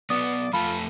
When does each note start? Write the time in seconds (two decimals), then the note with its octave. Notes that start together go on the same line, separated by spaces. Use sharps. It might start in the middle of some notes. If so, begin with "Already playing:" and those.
0.10 F#3 B3 B4 D5 D#6
0.53 F2 A3 F4 A5 B5